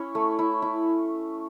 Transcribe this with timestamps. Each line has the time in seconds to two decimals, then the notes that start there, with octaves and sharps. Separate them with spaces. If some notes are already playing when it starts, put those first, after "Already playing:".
Already playing: C#4 E4 C#5
0.15 A3
0.39 E4
0.62 E4